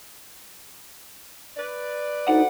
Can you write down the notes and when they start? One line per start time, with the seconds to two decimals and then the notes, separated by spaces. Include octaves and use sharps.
1.57 B4 D5
2.28 D2 D#4 F#5